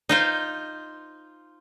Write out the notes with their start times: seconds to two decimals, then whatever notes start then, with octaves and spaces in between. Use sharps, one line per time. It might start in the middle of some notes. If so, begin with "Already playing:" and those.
0.09 D#4 F4 C5